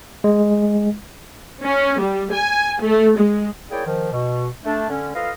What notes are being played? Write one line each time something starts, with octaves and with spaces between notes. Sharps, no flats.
G#3
C#4
G3
G#5
A3
G#3
A#3 E4 G#4 C#5 D5 G5
D#3 F3
B2
A3 D4
D3 C#4
F4 A4 B4 D#5 F5